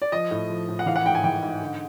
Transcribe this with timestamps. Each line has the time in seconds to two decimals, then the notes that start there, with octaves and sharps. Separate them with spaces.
0.02 D5
0.12 F3 D#5
0.31 A2
0.50 F3
0.68 A2
0.79 F#5
0.86 E3 F5
0.96 F#5
1.05 G#2 G5
1.15 G#5
1.24 E3 G5
1.43 G#2
1.61 D3